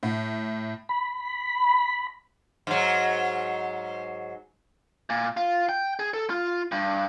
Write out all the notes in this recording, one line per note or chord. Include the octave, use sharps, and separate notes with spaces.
A2
B5
G#2 F#3
A#2
F4
G5
G#4
A4
F4
G2